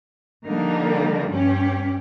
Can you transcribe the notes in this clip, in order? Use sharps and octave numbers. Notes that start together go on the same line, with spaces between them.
D3 F3 G3 A#3 D#4 A#4
G2 C#4 G4